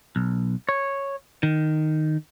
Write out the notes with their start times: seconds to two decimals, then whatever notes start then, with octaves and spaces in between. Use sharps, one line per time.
0.16 B1
0.69 C#5
1.43 D#3